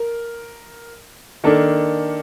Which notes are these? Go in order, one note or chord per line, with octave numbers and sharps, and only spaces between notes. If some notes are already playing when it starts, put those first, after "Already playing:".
Already playing: A#4
D#3 A#3 D4 A4